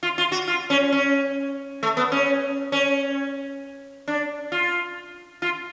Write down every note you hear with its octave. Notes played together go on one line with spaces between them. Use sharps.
F4
F4
F#4
F4
C#4
C#4
A3
B3
C#4
C#4
D4
F4
F4